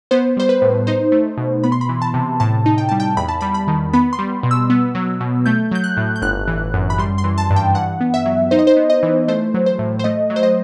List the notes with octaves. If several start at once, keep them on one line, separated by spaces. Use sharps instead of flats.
B3 C5
G3 C5
B4
A2
D#4 C5
A3
B2
B3 B5
C6
B5
E3
A5
C3
A2 A5
D#4
G5
G3 A5
G5
E2 B5
A5
G3 B5
B5
D#3
B3 B5
C6
G3
B2
E6
B3
F#3
B2
A3 G6
F#3 G6
F#6
A2
G6
G1 F#6
E3
F#2
B5
G3 C6
C6
E3
A5
G2
G5
G2 F#5
B3
E5
F#3
D#4 C5
D#5
C5
B3
D#5
E3
A3 C5
F#3
C5
A2
C5
A3 D#5
F#3
C5
D#5